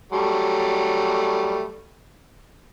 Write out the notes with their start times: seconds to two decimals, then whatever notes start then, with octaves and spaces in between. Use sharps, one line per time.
0.12 F#3 G3 A3